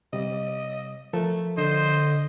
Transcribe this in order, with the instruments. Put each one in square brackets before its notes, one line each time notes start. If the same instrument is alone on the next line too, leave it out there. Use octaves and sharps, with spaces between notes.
[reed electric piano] C3 G3 [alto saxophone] D#5
[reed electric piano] F3 A4 A#4 [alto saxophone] A3
[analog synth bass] D3 [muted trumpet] C5 [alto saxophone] D#5